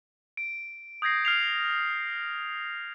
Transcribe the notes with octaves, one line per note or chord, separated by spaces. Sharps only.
D7
D#6 G6 G#6 A#6 C7
F6 C7 F7